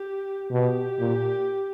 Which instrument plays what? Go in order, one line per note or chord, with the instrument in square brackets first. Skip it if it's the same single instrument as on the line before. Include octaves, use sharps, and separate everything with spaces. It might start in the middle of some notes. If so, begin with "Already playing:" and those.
Already playing: [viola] G4
[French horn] B2 [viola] G4
[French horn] A#2